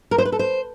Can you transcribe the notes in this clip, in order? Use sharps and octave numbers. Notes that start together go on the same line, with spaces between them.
A#4
C5
B4
A4
C5